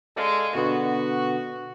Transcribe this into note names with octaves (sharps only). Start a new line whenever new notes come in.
G#3 A4 D5 F5
B2 D3 B3 F#4